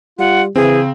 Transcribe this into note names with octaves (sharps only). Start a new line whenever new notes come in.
G3 F4 F#5
C#3 E3 C4 G#4